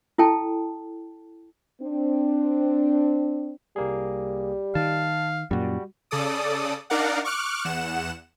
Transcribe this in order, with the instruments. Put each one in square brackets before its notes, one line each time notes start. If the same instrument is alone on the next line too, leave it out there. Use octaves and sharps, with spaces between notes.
[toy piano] E4 A4 G5 A5
[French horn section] C4 D4
[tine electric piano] C2 A#3 G#4 [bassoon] G3
[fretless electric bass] D#3 [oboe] F5 [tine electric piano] A5
[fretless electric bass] F#2 A#2 [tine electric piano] G3 F#4
[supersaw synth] C#3 A4 D5 D#6
D4 D#4 A#4 D5 F5 F#5
C#6 D6 F6 F#6
E2 F#5 E7